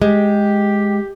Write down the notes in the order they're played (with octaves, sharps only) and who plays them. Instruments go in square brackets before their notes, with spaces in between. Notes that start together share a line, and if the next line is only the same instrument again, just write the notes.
[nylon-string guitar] G#3 [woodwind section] G4